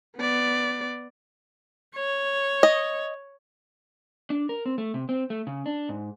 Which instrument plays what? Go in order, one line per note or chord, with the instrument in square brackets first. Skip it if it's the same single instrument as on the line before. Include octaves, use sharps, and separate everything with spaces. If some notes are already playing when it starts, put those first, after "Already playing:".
[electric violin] B3 D5
[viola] C#5
[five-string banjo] D#5
[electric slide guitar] D4
A#4
C4
A3
C3
C4
A3
C#3
D4
G#2